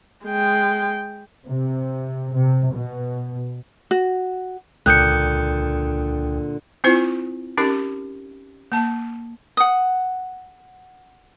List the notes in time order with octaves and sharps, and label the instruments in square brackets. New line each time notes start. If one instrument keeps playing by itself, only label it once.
[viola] G#3 G5
[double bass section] C3
C3
B2
[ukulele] F#4
[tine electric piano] C#2 G5 D#6 [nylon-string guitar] A#2 D3 [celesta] F#6 G6 C#7
[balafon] C4 E4 F4 C5
C#4 D#4 G4 A#4
A#3 A5
[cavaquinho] F#5 D#6